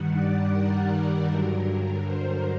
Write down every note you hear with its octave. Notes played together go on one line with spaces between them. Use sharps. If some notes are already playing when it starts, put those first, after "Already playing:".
Already playing: G2 D#3 G3 F#5
D5
A#4
G2 D3 F#3
C5